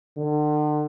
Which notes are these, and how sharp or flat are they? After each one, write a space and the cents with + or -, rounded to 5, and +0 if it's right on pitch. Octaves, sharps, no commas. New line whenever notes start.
D3 +40